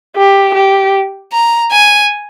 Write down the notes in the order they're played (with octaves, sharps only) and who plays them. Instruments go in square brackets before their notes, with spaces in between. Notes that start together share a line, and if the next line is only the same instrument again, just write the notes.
[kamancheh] G4
G4
[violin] A#5
G#5